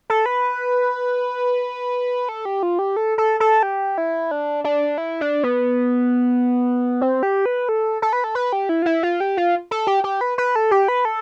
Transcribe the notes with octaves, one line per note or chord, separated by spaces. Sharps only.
A4
B4
A4
G4
F4
G4
A4
A4
A4
G4
E4
D4
D4
E4
D4
B3
C4
G4
B4
A4
A4
B4
A4
B4
G4
E4
F4
E4
F4
G4
F4
A4
G4
G4
B4
B4
A4
G4
B4
A4